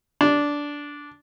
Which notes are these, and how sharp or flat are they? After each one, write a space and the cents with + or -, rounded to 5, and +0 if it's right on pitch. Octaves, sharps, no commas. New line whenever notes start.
D4 -10